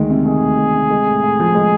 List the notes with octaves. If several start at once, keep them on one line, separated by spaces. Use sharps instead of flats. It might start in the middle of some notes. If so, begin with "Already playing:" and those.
Already playing: D2 D#3 G#3
C3
D#3 G#4
D2
G#3
C3
G#3
A2
A2
F3
G#3